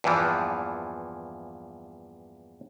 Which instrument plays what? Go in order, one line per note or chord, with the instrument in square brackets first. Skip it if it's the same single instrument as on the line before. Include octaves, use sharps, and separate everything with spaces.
[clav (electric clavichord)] E2 G2 A#2 E3 F3